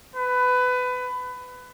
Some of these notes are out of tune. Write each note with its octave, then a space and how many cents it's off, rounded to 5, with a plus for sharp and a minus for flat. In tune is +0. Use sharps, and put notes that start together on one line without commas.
B4 +20